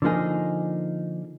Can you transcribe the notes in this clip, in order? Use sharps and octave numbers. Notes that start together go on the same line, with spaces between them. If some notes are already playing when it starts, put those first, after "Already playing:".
D3 F3 A#3 D#4 G#4